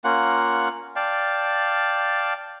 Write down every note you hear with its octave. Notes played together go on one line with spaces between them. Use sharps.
A#3 C#4 F4 F#5
D5 F5 G5 A5